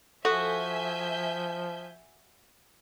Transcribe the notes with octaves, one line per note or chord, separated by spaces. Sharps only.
F3 F#4 A4 E5 G#5 G6